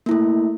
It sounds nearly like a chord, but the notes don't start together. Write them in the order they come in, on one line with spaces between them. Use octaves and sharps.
A#3 E4 A3